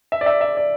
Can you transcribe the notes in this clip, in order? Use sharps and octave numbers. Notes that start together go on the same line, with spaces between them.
E5
D5
E5
E5
D5